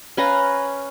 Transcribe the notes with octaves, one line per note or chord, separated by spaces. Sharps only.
C#4 B4 F5 A#5